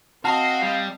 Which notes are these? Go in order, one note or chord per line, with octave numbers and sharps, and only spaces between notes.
C4 F#4 D#5 F5 A5 A#6 C7
G3